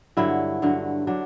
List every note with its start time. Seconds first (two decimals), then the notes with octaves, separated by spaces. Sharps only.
0.17 G2 D3 F#3 E4
0.62 G2 D3 F#3
1.07 D3 F#3 D4